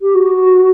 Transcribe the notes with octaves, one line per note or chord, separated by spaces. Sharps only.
G4
F#4